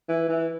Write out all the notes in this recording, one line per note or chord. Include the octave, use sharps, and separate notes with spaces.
E3
E3